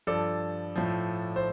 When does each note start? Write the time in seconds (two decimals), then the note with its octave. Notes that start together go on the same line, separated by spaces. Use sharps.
0.07 G2 F3 A4 D5
0.75 A2 F3
1.36 C5